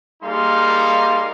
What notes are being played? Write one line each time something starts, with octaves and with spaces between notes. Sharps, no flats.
G3 A#3 D#4 G#4 F5 C6